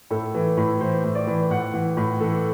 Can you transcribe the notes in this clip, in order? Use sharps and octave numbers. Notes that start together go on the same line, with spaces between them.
A2 A4
E3
A2
E3 C5
A2
D5
E3
A2 F#5
E3
A2
E3 A4